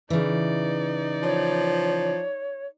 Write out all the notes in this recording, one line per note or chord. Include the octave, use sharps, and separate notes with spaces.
C#3 E3 D#4 D5
F3 C#5